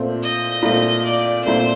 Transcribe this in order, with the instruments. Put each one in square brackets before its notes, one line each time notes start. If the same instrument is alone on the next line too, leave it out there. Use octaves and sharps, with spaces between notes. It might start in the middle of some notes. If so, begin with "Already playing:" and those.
Already playing: [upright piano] A#2 A3 C4
[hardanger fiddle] D#5
[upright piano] A#2 A3 C4 [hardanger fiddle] D#5
[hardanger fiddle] D5
[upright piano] A#2 A3 C4 [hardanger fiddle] C5